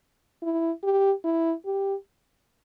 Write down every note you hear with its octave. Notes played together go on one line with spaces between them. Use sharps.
E4
G4
E4
G4